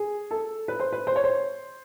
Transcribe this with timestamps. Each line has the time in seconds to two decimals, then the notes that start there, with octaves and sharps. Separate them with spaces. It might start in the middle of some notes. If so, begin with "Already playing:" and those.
Already playing: G#4
0.31 A4
0.68 B4
0.80 C5
0.92 B4
1.07 C5
1.16 C#5
1.24 C5